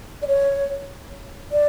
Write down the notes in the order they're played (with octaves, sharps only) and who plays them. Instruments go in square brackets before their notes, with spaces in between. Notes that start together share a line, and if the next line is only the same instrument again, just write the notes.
[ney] D5
C#5
D5